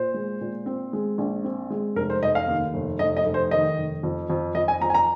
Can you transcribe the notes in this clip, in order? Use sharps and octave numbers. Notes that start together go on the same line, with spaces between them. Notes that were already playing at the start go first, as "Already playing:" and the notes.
Already playing: A#2 C5
G#3
A#2
C4
G#3
A#1
C4
G#3
F1 A#4
C5
F1 D#5
F5
D#2
F1
F1 D#5
D#5
F1
C5
D#3 D#5
F1
F2
F2
F2 D#5
G#5
F2 A#5
G#5
A#5